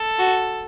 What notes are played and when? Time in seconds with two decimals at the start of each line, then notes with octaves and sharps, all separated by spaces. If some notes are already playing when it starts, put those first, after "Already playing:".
Already playing: A4
0.19 F#4